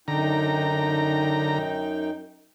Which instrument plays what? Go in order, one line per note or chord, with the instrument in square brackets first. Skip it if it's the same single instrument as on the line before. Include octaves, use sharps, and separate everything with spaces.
[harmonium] F#2 D#4 G5 [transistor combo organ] D3 A#5